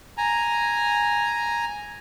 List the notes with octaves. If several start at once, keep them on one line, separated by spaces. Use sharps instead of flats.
G#5 A#5